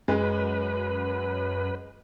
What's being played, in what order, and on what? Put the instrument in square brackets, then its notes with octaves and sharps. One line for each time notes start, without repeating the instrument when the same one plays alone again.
[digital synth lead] F#2 [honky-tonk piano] G#3 [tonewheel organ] B4